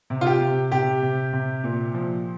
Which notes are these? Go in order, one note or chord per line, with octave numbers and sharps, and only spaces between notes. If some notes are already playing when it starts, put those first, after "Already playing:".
C3
F4
G4
C3
C3 G4
C3
C3
A#2
F3